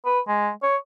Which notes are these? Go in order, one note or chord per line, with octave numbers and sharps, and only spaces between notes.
B4
G#3
C#5